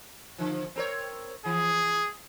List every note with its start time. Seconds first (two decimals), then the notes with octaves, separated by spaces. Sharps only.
0.38 D3 F3
0.76 C4 A#4 C#5
1.46 E3 G#4